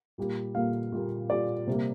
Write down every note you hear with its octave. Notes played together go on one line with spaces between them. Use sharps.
A#2 G3 A#3
A#2 G3 A#3 F5
A#2 G3 A#3
A#2 G3 A#3 D5
C3 G3 A#3